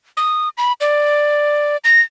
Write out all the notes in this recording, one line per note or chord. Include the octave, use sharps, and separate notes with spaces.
D#6
B5
D5
A#6